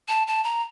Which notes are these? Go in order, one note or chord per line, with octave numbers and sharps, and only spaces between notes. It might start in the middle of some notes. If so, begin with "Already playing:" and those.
A5
A5
A#5